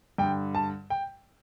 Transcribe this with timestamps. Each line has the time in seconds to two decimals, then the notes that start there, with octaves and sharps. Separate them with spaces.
0.18 G2 D3 G5
0.55 A5
0.90 G5